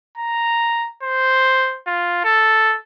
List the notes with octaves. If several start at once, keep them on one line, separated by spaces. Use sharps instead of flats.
A#5
C5
F4
A4